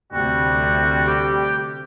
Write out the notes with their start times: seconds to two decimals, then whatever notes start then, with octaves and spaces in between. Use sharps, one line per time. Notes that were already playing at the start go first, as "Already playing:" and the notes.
0.13 D2 C3 G3 F#4
1.06 G4